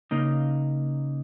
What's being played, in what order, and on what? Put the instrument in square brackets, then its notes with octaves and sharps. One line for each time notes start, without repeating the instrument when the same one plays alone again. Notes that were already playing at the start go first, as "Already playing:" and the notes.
[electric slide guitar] C#3 A#3 D#4